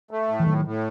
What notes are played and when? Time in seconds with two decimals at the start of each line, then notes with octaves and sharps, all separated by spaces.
0.11 A3
0.28 A2
0.40 E3
0.46 A2 D#3 F#3
0.65 A2